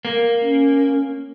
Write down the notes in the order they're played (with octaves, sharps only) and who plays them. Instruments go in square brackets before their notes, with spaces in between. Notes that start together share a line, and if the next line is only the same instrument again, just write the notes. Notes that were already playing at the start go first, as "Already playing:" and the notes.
[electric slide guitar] A#3
[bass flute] C#4